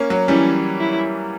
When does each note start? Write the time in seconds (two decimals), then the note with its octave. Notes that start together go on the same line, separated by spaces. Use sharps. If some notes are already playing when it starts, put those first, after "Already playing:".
Already playing: A#3 C#4
0.10 F#3
0.28 E3 G3 C#4
0.80 E4